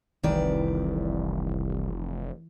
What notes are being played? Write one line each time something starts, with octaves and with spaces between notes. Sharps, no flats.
F1 C2 D#3 E3 E4 D5